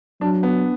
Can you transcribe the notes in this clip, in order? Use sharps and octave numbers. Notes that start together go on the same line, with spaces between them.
F#3 D4
B3